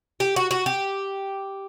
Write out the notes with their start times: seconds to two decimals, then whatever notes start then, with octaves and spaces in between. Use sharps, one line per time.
0.20 G4
0.36 F#4
0.51 F#4
0.66 G4